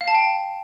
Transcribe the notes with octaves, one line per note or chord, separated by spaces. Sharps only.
F5
A5
G5